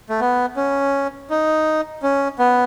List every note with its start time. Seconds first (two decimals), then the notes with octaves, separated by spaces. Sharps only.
0.10 A3
0.20 B3
0.56 C#4
1.30 D#4
2.03 C#4
2.39 B3